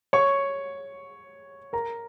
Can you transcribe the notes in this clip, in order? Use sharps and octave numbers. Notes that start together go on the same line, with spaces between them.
C#5 C#6
A#4 A#5